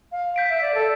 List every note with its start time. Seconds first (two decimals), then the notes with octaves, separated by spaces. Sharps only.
0.12 F5
0.36 G6 B6 D7
0.49 E5
0.61 D5
0.74 A4